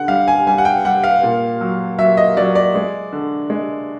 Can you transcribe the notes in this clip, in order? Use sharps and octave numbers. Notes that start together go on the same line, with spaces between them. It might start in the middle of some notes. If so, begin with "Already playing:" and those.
Already playing: D3 F#5
G3 F5
G#5
G3 G#5
F#5
G5
G3 F#5
F5
A#2
F#3
F#3 E5
D#5
F#3 D5
D5
G#3
D3
G#3